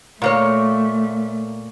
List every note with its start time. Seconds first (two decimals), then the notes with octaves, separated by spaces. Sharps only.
0.22 A#2 A3 A#3 C#5